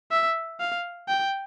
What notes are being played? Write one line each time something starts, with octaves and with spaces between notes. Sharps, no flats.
E5
F5
G5